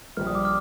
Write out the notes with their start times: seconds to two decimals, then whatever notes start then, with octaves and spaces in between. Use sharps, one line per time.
0.17 A#1 A#2 G3 F6
0.27 D#6
0.35 D6
0.45 F6